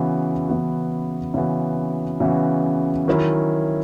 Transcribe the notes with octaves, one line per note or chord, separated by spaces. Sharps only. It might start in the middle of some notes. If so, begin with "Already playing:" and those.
Already playing: C#3 E3 B3 F#4
C#3 E3 B3 F#4
C#3 E3 B3 F#4
C#3 E3 B3 F#4
D#3 F#3 C#4 E4